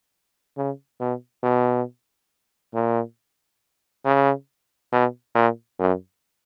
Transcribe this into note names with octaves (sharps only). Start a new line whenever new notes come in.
C#3
B2
B2
A#2
C#3
B2
A#2
F#2